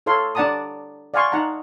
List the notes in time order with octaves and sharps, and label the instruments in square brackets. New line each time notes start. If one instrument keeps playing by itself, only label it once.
[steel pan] E4 A4 C#5 F5 C6
D4 D5 F#5 A5 A#5 D#6
D5 F5 F#5 G#5 C6 C#6
D#4 F#5 A5 A#5